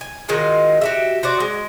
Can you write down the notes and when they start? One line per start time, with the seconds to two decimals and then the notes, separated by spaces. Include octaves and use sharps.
0.01 G#5
0.28 D#3 F#3 G#3 F4
0.81 F#4 G4 E5
1.23 F#4 C5 D5
1.40 G#3